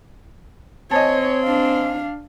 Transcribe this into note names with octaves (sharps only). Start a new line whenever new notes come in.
C4 C#5 D#5 G#5 A5
D4 F5